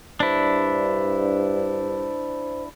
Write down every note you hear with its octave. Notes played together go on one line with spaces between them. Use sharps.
G2 D4 E4 C5